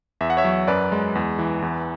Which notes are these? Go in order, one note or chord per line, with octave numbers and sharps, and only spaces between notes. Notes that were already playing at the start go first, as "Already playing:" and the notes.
E2 E5
F#5
C#5 E5
F#3
F#2 B4 D5
G#3
E2
E3
E2